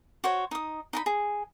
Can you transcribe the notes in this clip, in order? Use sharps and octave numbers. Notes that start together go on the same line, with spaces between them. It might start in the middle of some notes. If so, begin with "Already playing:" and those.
F#4 C5 C#5
D#4 D#6
D#4 G5 B5
G#4